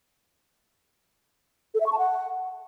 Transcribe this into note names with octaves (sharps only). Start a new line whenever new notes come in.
A4
E5
C#6
A5
F#5